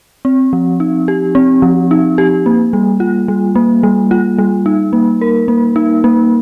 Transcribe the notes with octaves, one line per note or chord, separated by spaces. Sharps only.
C4
F3
D#4
G4
C4
F3
D#4
G4
A#3
G3
F4
G3
A#3
G3
F4
G3
D#4
A#3
A#4
A#3
D#4
A#3